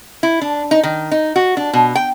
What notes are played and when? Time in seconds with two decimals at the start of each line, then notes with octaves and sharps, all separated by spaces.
0.23 E4
0.41 D4
0.71 D#4
0.83 D#3
1.11 D#4
1.36 F#4
1.57 D4
1.73 B2
1.95 G5